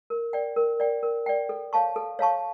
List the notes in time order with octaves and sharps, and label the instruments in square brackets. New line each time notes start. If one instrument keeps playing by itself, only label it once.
[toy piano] A#4
D5 G5
A#4
D5 G5
A#4
D5 G5
A4
C#5 F5 A5 C#6
A4
C#5 F5 A5 C#6